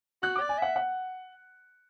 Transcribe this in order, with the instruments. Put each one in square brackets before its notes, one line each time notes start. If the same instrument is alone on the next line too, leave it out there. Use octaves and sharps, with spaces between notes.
[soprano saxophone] F#4 [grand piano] F#6
[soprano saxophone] D5 [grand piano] D6
[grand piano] G#5
[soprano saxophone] E5 [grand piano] F#5
[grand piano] F#5